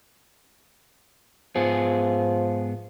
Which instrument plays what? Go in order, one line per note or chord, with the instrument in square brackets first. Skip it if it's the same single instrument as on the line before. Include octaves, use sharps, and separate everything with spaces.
[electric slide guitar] G#2 B3 G#4 [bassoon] F3